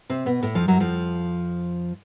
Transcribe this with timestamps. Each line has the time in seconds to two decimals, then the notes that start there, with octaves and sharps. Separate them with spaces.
0.09 C3 C4
0.26 B2 B3
0.42 A2 A3
0.55 F2 F3
0.68 F#2 F#3
0.80 F2 F3